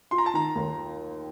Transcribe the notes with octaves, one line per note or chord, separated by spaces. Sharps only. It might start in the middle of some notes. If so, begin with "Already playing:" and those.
F4 C6
A#5
A5
D#3 A#5
D#2